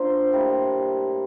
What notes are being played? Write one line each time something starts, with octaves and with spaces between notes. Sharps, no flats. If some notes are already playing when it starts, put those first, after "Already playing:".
Already playing: F3 A#3 D4 C5
A2 G3 A#3